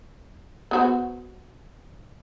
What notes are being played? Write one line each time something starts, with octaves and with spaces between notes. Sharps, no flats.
B3 F#4 C5